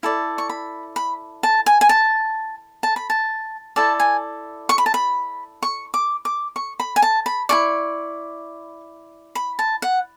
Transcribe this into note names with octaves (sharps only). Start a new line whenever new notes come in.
E4 A4 D5
C#6
B5
B5
A5
G#5
G#5
A5
A5
B5
A5
E4 A4 D5 A5
G#5
C#6
B5
A5
B5
C#6
D6
D6
C#6
B5
G#5
A5
B5
E4 A4 D5 C#6
B5
A5
F#5